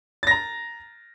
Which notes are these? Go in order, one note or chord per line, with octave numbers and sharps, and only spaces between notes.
A#5 A6 A#6